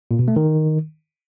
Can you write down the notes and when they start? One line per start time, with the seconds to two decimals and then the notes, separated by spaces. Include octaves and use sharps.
0.11 A#2
0.19 B2
0.28 A3
0.36 D#3